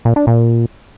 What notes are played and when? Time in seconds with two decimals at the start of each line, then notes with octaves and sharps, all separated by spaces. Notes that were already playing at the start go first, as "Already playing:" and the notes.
0.05 A#2
0.16 D4
0.27 A#2